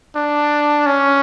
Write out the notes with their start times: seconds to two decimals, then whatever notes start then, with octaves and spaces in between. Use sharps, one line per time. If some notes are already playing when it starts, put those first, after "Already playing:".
0.16 D4
0.86 C#4